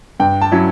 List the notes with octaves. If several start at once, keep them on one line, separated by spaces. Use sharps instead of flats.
G2 G5
A5
F#3 C#4 E4